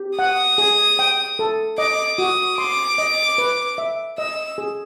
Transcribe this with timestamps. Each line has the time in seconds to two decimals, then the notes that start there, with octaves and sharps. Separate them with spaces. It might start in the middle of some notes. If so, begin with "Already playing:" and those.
Already playing: G4
0.19 F#5 D#6
0.58 G#4
0.99 G5
1.39 A4
1.78 D#5 D6
2.18 F#4 D#6
2.58 C6 D6
2.98 D#5
3.38 B4
3.78 E5
4.18 D#5 E6
4.58 G#4